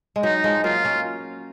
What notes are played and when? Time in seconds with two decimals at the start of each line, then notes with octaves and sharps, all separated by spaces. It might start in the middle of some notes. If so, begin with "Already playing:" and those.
0.16 G#3
0.23 F#3 D#4
0.44 F3 G#3
0.64 F#3 A#3 F4
0.85 A#3 C#4